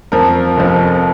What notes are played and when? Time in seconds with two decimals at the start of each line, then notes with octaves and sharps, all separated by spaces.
0.12 F2 F3 A#4
0.57 F1 F2 F3